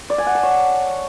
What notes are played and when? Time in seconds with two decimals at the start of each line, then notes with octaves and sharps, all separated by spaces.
0.10 D5
0.18 G#5
0.27 F#5
0.35 A5
0.43 C#5